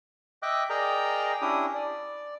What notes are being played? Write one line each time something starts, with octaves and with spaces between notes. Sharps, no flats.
D#5 E5 G5 D6 F#6
G#4 A#4 D5 D#5 G5 A#5
C#4 D4 E4 G4 D#6
D5